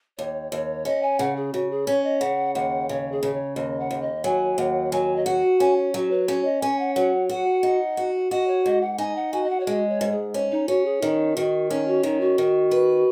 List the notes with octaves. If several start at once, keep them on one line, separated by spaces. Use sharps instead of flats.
D#2 C#5
D#2 C#5
C#4 D#5
G#5
C#3 F#5
G#4
C#3 F#4
G#4
C#4 C#5
D#5
C#3 F#5
D#2 F#5
C#3 C#5
G#4
C#3
C#5
D#2 D#5
F#5
D#2
D#5
F#3 G#5
D#2 F#5
F#3 G#5
D#5
F#4 F#5
C#4 G#5
F#4
F#3 F#4
B4
C#4 C#5
D#5
C#4 G#5
F#5
F#3 F#5
F#4 F#5
D#4
F#4
F#4 D#5
C#5
G#2 D#5
F#5
D#4 G#5
F#5
F#4 G#5
D#5
F#5
C#5
G#3 D#5
C#5
G#2
G#4
C#4
D#4
C#4 F#4
G#4
D#3 D#4
D#3 F#4
C#4 D#4
F#4
D#3 D#4
F#4
D#3
B4